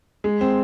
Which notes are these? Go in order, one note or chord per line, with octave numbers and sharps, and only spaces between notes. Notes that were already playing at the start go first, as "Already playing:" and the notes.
G#3
C4